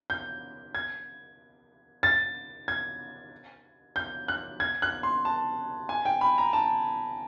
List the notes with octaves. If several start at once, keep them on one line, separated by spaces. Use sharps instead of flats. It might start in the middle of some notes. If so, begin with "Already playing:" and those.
G6
G#6
A6
G#6
G6
F#6
G#6
F#6
C6
A5
G#5
G5
B5
A#5
A5